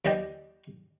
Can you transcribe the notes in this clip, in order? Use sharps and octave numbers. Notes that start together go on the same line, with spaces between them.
D#2 E3 D5 D#5 G5